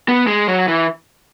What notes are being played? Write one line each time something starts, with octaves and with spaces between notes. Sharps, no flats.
B3
G#3
F#3
E3